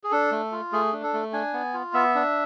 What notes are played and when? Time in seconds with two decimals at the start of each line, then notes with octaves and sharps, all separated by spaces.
0.04 G#4
0.11 D4 A4
0.32 A3
0.52 F4
0.72 A3 G#4
0.93 D4
1.03 A4
1.13 A3
1.33 D4 G#5
1.53 B3
1.74 F4
1.94 B3 E5
2.15 D4